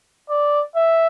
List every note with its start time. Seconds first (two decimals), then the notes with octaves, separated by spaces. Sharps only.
0.29 D5
0.76 E5